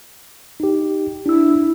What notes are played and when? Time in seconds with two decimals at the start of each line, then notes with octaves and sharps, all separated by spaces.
0.60 D#4 G4
1.26 D4 E4 E6